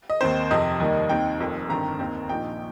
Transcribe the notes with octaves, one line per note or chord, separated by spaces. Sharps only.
D#5
D#2 D#3 C4 D#4 C5
F2 C3 F3 C4 D#5
D#2 D#3 G3 A#3 D#4
D#2 D#3 C4 D#4 G5
F1 F2 D#3
G1 G2 D#3 C4 A#5
D#2 D#3 C4
A#1 A#2 F3 D#4 G5